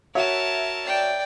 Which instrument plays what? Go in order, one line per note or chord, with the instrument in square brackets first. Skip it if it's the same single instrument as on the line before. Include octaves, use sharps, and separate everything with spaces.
[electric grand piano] F#4 C#5 [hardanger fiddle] A#4 A5 [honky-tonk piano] E5
[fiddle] D5 G5